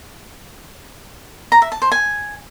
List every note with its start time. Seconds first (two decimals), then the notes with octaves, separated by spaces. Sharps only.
1.52 A#5
1.62 E5
1.72 A5
1.82 C5
1.92 G#5